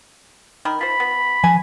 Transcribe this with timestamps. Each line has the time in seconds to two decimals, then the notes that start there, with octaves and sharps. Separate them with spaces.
0.65 D#3 A#4 B5
0.81 F4 C5 B5
1.00 B3
1.44 F3 G#5